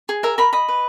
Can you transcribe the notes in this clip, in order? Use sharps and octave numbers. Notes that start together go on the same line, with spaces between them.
G#4
A#4 E5
A#4 B5
D#5 B5
B4